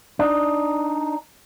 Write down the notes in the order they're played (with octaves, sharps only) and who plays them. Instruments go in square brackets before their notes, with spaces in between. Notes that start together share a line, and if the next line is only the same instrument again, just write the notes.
[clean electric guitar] D4 D#4